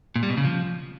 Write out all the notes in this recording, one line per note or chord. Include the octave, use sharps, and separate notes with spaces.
A#2
G3
B2
C#3
F3